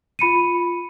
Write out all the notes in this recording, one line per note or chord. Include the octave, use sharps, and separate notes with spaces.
F4 B5 C#7 D#7